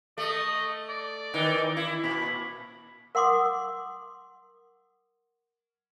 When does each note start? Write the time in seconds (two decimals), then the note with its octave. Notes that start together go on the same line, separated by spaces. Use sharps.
0.18 A3 D#5
0.89 D5
1.34 D#3 E3 D#4
1.77 E4
2.04 A#2 B5
3.15 A#4 F#5 C6 D6 D#6